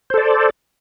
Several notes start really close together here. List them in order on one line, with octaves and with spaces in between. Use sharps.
C5 A4 D5